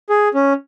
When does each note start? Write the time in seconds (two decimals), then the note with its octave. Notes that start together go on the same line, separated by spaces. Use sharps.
0.09 G#4
0.34 C#4